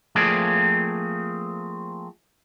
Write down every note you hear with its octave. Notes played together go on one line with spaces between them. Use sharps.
F3 A3 A#3 C4 G#4 D5